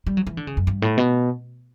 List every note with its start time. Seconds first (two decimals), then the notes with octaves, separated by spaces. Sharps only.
0.07 G3
0.17 F#3
0.27 E3
0.37 D3
0.47 C#3
0.57 F#2
0.67 G2
0.82 A2
0.97 B2